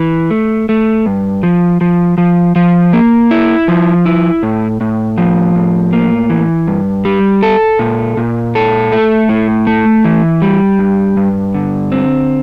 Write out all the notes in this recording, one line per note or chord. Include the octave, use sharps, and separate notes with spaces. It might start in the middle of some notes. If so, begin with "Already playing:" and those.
Already playing: E3
A3
A3
G2
F3
F3
F3
F3
A#3
E4
F3
E4
A2
A2
F3
A2
A#3
E3
G2
G3
A4
A#2
A#2
A4
A3
A2
A3
E3
G3
G2
G2
D3
C4